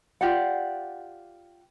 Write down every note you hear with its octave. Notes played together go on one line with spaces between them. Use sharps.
F4 G4 D5 F#5